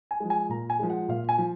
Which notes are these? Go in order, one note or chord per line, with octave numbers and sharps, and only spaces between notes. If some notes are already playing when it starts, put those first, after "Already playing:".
G#5
F3 G#3
G#5
A#2 A#5
G#5
F3 G#3
F#5
A#2 F5
G#5
F3